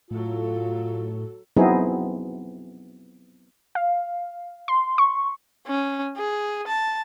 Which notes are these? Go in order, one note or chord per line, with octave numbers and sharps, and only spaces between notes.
A2 F#3 F4 A4
F#3 B3 C4 D#4 E4 G#4
F5
C6
C#6
C#4
G#4
A5